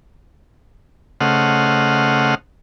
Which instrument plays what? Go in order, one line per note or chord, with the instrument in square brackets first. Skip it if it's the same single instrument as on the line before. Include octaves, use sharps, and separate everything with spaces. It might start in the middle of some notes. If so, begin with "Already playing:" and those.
[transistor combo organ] C#3 A3 C5 D#5 F#5 F6